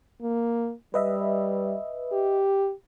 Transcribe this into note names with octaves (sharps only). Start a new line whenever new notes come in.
A#3
G3 B4 D#5 E5
G4